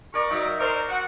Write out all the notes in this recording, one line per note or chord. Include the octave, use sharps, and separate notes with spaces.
A#4 D5 A#5 C#6
F#3 D#4 E5
A#4 C5 D5 C6 C#6
F#4 F#5